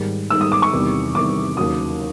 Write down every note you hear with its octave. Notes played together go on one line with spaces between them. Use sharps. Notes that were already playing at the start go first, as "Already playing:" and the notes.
Already playing: G#2 D#3 G3
G#2 D#3 G3 E6
D#6
D6
C#6
E2 C3 D#3 G3
E2 C3 D#3 G3 D6
D#2 C#3 F#3 D#6